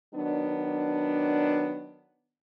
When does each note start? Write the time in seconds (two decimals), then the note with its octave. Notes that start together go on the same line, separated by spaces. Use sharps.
0.14 D#3 F#3 B3 D4